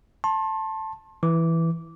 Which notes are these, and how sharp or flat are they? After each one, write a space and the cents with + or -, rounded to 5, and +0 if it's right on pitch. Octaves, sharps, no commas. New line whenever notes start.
A5 +0 C6 +35
E3 +0 D6 -15